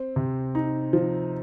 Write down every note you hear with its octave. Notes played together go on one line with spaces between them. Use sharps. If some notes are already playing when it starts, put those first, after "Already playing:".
Already playing: C4
C3
D#4
F3